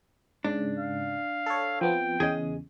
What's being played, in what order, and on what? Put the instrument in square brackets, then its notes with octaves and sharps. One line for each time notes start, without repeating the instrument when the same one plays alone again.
[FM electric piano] G#2 C#3 [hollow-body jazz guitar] D4
[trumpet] F5
[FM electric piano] A4 C#5
[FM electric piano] F3 B3 C4 [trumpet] G5
[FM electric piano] E2 C#3 [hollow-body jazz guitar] G#4 D#5